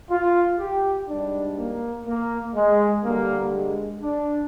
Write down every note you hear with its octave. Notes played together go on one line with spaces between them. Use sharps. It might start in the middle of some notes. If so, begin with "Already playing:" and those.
F4
G4
G#2 G3 D4
A#3
A#3
G#3
G2 D3 G3 A#3
G#3
D4